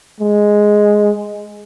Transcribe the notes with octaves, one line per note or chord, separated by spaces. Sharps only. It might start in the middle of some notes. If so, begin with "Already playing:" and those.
G#3